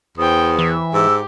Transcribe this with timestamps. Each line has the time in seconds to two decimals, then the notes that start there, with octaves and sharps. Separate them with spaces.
0.18 E2 C5 G5 D#6
0.59 E3 E5
0.94 G#2 G4 E6